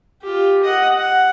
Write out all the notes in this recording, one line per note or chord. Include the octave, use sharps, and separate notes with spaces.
F4 G4
D#5 F#5
F#5